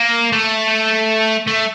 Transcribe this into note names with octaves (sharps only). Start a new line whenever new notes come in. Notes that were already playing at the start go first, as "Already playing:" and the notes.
Already playing: A#3
A3
A3